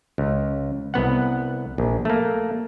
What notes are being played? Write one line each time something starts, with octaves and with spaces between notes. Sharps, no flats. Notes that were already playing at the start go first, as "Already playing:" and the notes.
C#2
C2 B3 F#5
A#1
A3 A#3